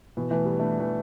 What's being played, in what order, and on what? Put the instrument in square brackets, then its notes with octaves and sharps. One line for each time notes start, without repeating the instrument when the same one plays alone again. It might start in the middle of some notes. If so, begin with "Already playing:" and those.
[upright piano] B2 E3
E3 A3
G3 B3
A3 D4
E3 A3